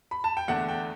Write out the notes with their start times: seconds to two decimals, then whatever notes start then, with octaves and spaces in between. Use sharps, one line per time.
0.11 B5
0.24 A5
0.37 G5
0.48 E2 D3 A3 D4 F#5
0.68 G5